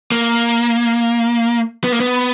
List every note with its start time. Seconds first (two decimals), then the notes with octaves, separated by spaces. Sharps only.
0.12 A#3
1.84 B3
1.92 A#3
2.00 B3